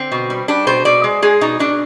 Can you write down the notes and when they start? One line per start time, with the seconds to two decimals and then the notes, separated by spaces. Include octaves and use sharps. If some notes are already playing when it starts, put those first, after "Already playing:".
Already playing: D3 C4
0.12 B2
0.30 G3
0.48 G3 D4
0.67 B2 C5
0.85 B2 D5
1.04 G#3
1.22 G#3 G#4
1.41 B2 D#4
1.59 B2 D4